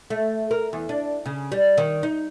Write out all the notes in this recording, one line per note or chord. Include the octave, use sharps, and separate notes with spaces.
A3
A#4
E2
D4
C#3
G3
D#3
D#4